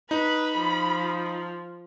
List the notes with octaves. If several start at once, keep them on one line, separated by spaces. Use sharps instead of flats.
D#4 B4 B5
F3